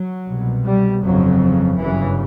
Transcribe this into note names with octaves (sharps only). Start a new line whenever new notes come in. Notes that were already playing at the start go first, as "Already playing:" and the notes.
Already playing: F#3
C2 B2
G3
G1 F2 C#3 F#3
G1 F#2 C#3 E3